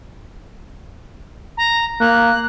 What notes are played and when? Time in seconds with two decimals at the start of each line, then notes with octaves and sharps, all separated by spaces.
1.57 A#5
2.00 A#3 F#6